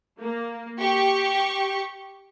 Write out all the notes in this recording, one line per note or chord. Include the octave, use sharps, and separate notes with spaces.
A#3
G4 C#6